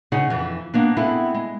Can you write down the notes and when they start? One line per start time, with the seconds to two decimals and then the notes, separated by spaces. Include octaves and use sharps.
0.12 C#3 C#4 D#4 G#4 F#5
0.30 F2 E3
0.74 A#3 B3 D4
0.97 B3 C4 E4 G#4 A4
1.34 G#3